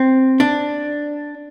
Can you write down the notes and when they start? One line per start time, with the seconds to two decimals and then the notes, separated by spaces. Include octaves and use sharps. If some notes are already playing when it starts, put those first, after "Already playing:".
Already playing: C4
0.40 D4